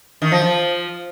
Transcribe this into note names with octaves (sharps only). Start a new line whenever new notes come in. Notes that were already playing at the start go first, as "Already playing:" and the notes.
D#3
F3
F3